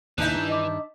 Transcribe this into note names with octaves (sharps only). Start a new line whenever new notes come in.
D#2 A2 C3 E3 D4 D#4 E5 F#6
G2 D#3
D#5 D6